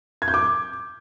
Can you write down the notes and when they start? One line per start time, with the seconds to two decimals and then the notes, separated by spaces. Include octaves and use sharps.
0.22 G#6
0.28 G6
0.34 D6